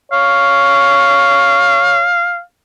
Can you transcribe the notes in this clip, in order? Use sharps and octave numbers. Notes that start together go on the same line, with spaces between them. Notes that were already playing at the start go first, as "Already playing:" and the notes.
C#5 F5